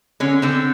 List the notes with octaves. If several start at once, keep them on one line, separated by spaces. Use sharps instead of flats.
D3 C#4
D3 C4